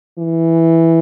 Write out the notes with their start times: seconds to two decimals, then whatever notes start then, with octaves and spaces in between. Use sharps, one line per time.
0.19 E3